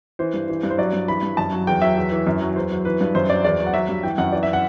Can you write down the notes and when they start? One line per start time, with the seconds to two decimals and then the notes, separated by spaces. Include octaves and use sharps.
0.19 E3 C5
0.34 G2
0.49 E3
0.63 G2
0.70 C5
0.78 F#3 D5
0.93 G2
1.08 E3 B5
1.23 G2
1.37 F#2 A5
1.52 F#3
1.67 E2 G5
1.82 F#3 E5
1.97 E2
2.12 E3
2.27 F#2
2.41 F#3
2.56 E2 C5
2.71 F#3
2.85 E3 B4
3.01 G2
3.15 F#2 C5
3.29 F#3 D5
3.44 E2 D5
3.59 F#3
3.67 F#5
3.74 F#3 E5
3.89 G2
4.03 E3 G5
4.18 F#2 F#5
4.32 E3 D5
4.43 E5
4.53 F#5